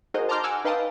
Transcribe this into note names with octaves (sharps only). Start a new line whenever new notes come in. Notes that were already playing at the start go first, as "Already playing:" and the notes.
D#4 F#4 G#4 A#4 C5 D#5
A5 A#5 C6 D6 F6 G6
F#5 G#5 D6 E6 F6
D#4 B4 F5 G5 A5 D#6